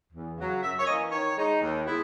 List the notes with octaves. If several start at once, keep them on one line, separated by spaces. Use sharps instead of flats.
E2
C#3 F#3
F#2 E5
C#5
E3 A#3 C#4 D#5
D#3 C#5
G#3 D#4
D#2
G#3 B3 E4